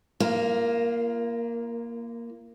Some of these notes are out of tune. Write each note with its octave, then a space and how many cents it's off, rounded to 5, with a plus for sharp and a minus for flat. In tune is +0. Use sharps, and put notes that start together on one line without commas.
A#3 +5 F4 -35